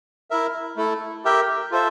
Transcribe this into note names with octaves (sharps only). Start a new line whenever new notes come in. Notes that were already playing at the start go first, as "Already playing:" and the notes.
E4 A#4 E5
A3 E4 A4
G4 A#4 E5 G5
F4 A4 C5 E5